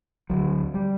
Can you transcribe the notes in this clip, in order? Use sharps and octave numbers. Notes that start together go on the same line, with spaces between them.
D2 D3 F#3
G3